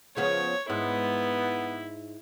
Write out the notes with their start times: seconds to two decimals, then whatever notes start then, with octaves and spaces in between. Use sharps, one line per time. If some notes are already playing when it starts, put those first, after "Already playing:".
0.17 C#3 F3 B3 C#5
0.70 G#2 B3 E4